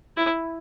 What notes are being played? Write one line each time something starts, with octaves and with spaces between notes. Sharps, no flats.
E4